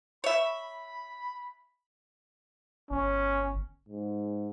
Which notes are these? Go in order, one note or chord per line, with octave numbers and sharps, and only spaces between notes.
C#5 E5 B5
G1 C#4
G#2